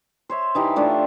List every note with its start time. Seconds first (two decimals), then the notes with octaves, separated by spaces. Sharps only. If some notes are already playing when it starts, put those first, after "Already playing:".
0.29 C5 C#5 E5
0.55 E3 D#4 G4
0.76 A3 D4 F4